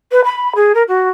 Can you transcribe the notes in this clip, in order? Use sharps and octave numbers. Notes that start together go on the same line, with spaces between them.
B4
B5
G#4
A#4
F#4